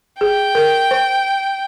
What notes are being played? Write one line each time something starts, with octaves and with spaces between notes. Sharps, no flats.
G#4 G5
A#4
C5